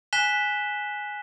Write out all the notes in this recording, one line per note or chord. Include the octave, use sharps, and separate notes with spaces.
G#5 F#6 B6 E7 G7